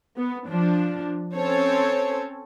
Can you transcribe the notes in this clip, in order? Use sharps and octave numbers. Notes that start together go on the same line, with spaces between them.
B3
F3 D4
C4 C#4 A4 C5 C#5